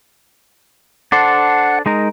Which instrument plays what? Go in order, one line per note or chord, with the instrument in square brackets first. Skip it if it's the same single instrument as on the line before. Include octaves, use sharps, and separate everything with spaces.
[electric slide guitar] D4 A4 C5 [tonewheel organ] F#5
[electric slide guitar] G#3 D#4 A#4